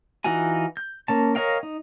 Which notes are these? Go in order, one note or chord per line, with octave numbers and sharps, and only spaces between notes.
E3 D#4 F4 F#4 G#5
G6
A#3 C#4 A5
A#4 C#5 D#5 F5 G5
D#4